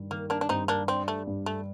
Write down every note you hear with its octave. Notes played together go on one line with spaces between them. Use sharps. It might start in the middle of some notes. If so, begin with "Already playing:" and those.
Already playing: G2 D#3
D#3 A#3
A#3 D4
D4
G2 C4 D#4
A#3 D4
C4 D4
A3
G2
A3